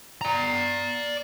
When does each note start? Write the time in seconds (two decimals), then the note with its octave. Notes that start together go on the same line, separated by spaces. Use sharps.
0.21 D5 A#5